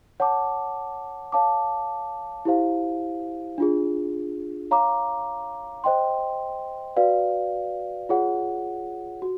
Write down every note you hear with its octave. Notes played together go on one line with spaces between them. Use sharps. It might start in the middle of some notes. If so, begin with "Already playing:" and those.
C#5 F#5 A5 D6
C#5 F5 A5 D6
E4 G4 C5 F5
D4 F4 G#4
C#5 F5 A#5 D6
C5 D#5 G5 C6
F#4 B4 D5 F5
F4 G#4 C#5 F#5
F#4